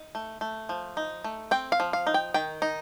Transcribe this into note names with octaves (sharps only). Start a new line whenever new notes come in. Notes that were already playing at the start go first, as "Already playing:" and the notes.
Already playing: D#4
A3
A3
F3
D#4
A3
C4 G5
F5
F3
F5
D#4
G5
D#3 G5
D#4